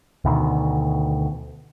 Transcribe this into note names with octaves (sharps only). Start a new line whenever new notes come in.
D2 B2 D#3